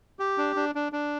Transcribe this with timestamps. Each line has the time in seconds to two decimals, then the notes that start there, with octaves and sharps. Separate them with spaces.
0.19 G4
0.38 D4
0.56 D4
0.75 D4
0.92 D4